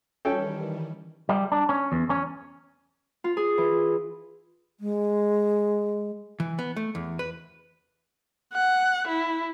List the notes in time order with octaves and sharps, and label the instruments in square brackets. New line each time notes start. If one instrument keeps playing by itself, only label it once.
[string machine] D#3 E3 G3 [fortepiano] C#4 A4 G5
[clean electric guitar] G3
D4
C#4
E2
C#4
[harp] F4
G#4
E3
[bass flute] G#3
[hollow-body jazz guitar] E3
B3
A3
E2
B4
[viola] F#5
E4